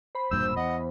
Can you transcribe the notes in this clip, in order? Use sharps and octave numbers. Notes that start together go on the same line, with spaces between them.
C5 B5
E1 G2 A#2 E6 G6
E2 D#5 F#5